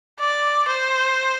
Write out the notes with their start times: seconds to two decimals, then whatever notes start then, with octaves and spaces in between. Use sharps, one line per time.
0.20 D5
0.68 C5